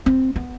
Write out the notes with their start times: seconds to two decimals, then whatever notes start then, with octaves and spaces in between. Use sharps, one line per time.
0.06 C4
0.36 B3